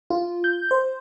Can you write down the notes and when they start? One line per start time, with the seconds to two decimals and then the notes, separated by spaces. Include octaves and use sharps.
0.10 F4
0.44 G6
0.71 C5